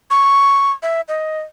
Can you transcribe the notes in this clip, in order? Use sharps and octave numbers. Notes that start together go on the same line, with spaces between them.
C#6
E5
D#5